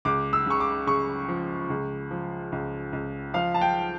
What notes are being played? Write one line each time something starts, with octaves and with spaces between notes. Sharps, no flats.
C#2 D6
E6
C#3 C#6
D6
C#3 C#6
F3
C#2
F3
C#2
C#2
F3 F5
A5
G5